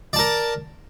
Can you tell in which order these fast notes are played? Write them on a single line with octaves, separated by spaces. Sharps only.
D5 A5 A#4